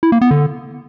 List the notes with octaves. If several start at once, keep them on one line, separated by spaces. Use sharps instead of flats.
E4
A#3
B3
D3